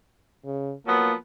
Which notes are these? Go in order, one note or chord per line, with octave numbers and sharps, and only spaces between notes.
C#3
F3 F#3 A#3 B3